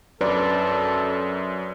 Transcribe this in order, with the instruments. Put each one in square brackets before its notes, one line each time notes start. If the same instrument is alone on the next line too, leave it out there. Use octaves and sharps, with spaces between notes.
[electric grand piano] F#2 [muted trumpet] A4 [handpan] B4 D5